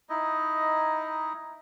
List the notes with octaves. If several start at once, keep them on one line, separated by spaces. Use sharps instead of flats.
D#4 E4 D#5